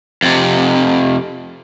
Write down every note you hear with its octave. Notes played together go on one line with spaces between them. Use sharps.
F2 C3